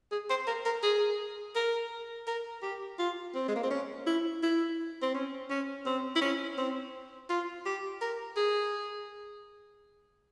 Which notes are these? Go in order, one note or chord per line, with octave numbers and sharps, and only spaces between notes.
G#4
C5
A#4
A#4
G#4
A#4
A#4
G4
F4
C4
G#3
A#3
C4
C#4
E4
E4
C4
C#4
C#4
C4
E4
C#4
C4
F4
G4
A#4
G#4